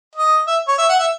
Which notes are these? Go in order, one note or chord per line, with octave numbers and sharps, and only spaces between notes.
D#5
E5
C#5
E5
F#5
E5